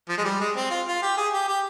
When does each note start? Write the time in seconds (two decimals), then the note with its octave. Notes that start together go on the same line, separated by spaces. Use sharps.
0.09 F3
0.18 G#3
0.24 G3
0.40 G#3
0.56 C4
0.70 F4
0.87 F4
1.02 G4
1.17 G#4
1.33 G4
1.48 G4